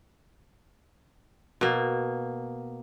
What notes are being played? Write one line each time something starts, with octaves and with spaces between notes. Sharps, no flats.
B2 A#3